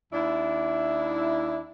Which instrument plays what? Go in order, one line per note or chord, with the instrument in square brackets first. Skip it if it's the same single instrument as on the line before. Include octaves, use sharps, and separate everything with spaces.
[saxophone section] D#2 D4 E4